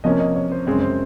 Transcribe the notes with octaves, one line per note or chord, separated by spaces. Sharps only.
C3 F3 A#3 C#4 D#5
D#5
C#5
C5
F#2 C#3 G#3 C4 C#5
C5